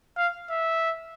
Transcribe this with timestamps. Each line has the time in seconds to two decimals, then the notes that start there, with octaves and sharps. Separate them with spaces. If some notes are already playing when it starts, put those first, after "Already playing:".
0.17 F5
0.50 E5